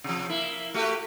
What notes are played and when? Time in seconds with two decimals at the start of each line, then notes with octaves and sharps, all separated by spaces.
0.04 C3 F3
0.29 A#3 E4
0.74 A3 F#4 G4